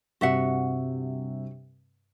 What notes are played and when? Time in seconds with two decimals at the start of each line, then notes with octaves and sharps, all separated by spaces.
0.21 G2 C3 F#4 E5 F#5